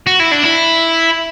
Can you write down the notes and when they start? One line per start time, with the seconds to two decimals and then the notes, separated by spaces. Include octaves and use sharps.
0.07 F#4
0.20 E4
0.32 D4
0.44 E4